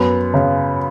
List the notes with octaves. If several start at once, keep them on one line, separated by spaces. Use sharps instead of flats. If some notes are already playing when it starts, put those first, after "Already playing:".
Already playing: F#2 B3
C#3